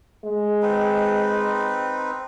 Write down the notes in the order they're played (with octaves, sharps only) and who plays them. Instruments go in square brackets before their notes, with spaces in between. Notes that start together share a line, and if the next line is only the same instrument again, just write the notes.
[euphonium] G#3
[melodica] C4 D#4 B4